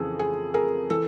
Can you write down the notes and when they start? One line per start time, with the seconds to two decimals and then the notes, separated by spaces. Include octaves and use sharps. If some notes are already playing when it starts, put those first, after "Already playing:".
Already playing: F2 C#3 E3 G#4 A4
0.19 G#4
0.54 G#4 A#4
0.90 E3 A4